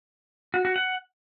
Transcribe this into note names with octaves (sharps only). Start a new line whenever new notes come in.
F#4
F#4
F#5